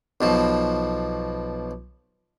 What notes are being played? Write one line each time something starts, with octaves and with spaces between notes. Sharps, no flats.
B1 B2 F3